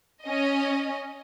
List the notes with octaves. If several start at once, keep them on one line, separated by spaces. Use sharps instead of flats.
C#4 D#5